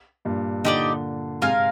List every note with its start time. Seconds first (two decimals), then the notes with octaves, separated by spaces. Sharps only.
0.25 G2 A#2
0.64 A#2 D3 D#4 G4 D5
1.42 G#2 C3 F4 A#4 F5 G#5